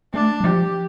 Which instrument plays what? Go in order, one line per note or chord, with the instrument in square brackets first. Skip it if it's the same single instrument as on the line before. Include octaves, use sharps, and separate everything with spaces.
[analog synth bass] A3 [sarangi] D4
[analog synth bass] G3
[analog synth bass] F3 [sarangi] G4